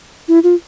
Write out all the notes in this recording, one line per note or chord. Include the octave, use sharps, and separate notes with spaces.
E4
F4